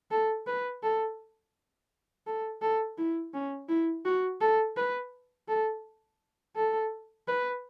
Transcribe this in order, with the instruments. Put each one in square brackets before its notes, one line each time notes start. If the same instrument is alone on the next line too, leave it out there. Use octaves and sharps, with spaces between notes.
[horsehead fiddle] A4
B4
A4
A4
A4
E4
C#4
E4
F#4
A4
B4
A4
A4
B4